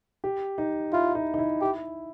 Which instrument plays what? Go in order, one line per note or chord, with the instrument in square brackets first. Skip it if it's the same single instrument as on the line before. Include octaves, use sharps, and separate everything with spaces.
[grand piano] G4
D#4
[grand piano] E4 [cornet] F4
[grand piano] D#4
D#4
E4
[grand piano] E4 [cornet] G4